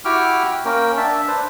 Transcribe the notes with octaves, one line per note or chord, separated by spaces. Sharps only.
E4 F#4 G4 G5 D6 F6
A#3 C#4 A#4 G5
D4 E5 A5
D4 B4 C5